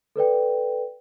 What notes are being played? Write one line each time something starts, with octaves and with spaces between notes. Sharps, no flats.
A4 B4 D5 G5